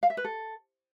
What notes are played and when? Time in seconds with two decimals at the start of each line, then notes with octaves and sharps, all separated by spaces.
0.03 F5
0.10 E5
0.17 B4
0.25 A4